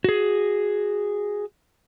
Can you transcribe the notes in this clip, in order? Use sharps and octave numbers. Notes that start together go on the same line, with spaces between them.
F#4 G#4